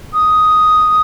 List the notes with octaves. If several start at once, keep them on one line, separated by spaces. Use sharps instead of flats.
D#6